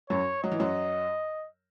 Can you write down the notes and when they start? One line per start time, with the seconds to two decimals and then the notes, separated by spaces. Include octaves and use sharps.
0.10 F#2 F#3 C#5
0.43 F#3 D#5
0.52 E3
0.59 F#2 F#3